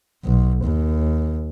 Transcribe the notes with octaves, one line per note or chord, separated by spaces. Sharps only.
B1
D#2